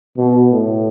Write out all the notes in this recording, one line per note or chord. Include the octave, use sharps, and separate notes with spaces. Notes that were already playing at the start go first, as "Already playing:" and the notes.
B2
A2